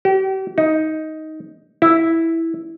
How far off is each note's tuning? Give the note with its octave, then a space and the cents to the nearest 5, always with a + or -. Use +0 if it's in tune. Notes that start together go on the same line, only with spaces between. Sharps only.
G4 -40
D#4 +10
E4 -5